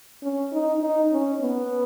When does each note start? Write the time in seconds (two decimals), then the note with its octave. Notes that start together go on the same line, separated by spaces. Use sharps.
0.23 C#4
0.52 D#4
0.82 D#4
1.12 C#4
1.41 B3